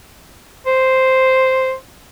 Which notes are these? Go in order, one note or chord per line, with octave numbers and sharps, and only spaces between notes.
C5